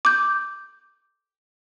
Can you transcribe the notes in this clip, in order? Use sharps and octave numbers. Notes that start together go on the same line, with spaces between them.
D6 G6